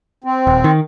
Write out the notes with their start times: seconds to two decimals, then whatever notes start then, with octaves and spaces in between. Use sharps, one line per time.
0.24 C4
0.47 D#1
0.64 D#3